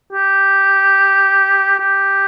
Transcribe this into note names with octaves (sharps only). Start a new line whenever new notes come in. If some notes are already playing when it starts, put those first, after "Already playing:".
G4
G4